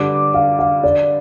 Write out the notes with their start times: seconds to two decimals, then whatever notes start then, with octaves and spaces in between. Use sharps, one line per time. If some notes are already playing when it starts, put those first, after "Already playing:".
Already playing: G2 D3 G3 D6
0.34 F5
0.59 F5
0.83 D5